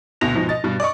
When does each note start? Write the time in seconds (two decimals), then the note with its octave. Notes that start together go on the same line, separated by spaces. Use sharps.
0.21 D2 B2 A#6 F7
0.35 G#2 B2 F3
0.49 D#5 A6
0.64 G2 B2
0.80 D5 D#5 C#6